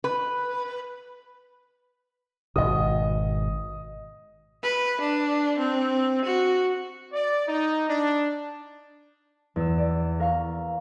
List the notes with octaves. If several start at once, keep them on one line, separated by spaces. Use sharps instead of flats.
B4
G#1 B2 D#5 D#6
B4
D4
C4
F#4
D5
D#4
D4
E2 E6
D5
A#4 F5 C#6